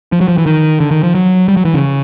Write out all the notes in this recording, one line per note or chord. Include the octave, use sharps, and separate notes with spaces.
F3
F#3
F3
E3
D#3
D3
D#3
F3
F#3
G3
F#3
E3
C#3